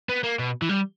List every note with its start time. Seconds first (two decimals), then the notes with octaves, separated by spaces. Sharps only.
0.09 B3
0.24 A#3
0.39 B2
0.62 E3
0.69 G3